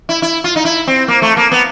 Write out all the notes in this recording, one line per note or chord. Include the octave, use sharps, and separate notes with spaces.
E4
E4
F4
D#4
E4
C4
A#3
A3
A#3
B3